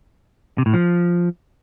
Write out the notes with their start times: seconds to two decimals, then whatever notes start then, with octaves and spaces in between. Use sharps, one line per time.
0.58 C3
0.66 A2
0.74 F3